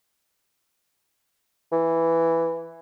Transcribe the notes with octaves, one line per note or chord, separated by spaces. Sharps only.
E3